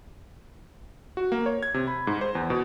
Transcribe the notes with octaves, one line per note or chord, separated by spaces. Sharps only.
F#4
A#3
C#5
G#6
C3
B5
G#2
C5
E2
B2